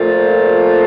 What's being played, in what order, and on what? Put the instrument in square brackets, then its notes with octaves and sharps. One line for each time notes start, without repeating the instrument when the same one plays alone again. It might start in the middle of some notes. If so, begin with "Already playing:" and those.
Already playing: [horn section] A#2 F3 A3